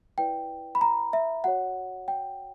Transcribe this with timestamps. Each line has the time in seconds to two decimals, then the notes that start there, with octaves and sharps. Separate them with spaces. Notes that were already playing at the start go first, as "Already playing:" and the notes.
0.18 E4 B4 D5 G5
0.75 B5
0.81 A#5
1.13 E5
1.44 F#4 C#5 F#5
2.08 G5